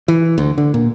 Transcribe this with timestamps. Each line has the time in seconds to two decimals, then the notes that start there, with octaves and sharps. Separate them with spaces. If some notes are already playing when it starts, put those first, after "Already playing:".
0.08 E3
0.38 D2
0.58 D3
0.74 A#2